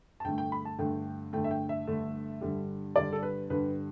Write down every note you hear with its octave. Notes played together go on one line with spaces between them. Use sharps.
A5
G2 D3 A3 G5
G5
B5
A5
G2 D3 A3 G5
G2 D3 A3 G5
E5
G5
E5
G2 D3 A3
G2 D3 G3
G2 D3 G3 D5
A4
B4
G2 D3 G3 B4